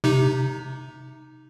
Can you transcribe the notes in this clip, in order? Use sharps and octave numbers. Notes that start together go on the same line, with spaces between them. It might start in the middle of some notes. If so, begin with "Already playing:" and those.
C3 D#4